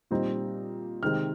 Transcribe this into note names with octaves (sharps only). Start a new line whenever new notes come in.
A#2 G3 C4 D#4
C3 D#3 G#3 C4 D#4 F6